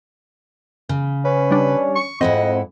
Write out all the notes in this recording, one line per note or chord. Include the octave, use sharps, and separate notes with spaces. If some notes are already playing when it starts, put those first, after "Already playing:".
C#3
C#4 B4
G3 D4
C#6
F2 G#2 C4 E4 D#5 F#5